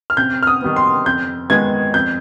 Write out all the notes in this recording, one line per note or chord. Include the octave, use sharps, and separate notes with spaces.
F6
C3 G6
F6
D#6
D#3 G3 B3
C6
F2 G6
D#3 G#3 B3 G#6
F2 G6